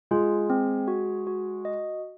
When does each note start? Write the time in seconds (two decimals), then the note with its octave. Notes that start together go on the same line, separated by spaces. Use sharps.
0.11 G#3 F4
0.50 C4
0.88 F#4
1.27 F#4
1.65 D#5